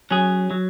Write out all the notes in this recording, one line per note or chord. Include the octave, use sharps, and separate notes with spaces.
F#3 C#4 G#4
F#3